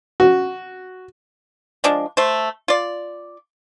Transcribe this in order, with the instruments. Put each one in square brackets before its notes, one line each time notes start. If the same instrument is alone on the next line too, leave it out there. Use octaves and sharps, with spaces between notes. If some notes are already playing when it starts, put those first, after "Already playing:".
[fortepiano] F#4
[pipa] F3 G#3 D4
A3 C5
F4 D5